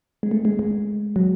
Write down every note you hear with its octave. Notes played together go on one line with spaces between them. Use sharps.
G#3
A3
G#3
G#3
F#3